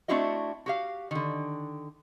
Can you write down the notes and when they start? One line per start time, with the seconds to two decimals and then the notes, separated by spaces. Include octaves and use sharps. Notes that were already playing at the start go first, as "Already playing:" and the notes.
0.08 A3 C4 D4 E4 F#4 D#5
0.66 F#4 G4 F5
1.11 D3 D#3